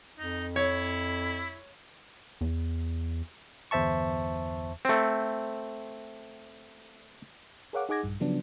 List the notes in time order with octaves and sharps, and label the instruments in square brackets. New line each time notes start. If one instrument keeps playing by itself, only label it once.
[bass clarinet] F2 [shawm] D#4
[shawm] E4 [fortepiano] C#5
[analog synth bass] E2
[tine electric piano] G1 E2 C5 E5 A5 C#6
[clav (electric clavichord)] A3 C4
[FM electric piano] G#4 A#4 C#5 F5 F#5 D6
D#4 G#4 F#5 D6 G#6 A#6
A#1 G2
C#3 F3 F#3 B3 D4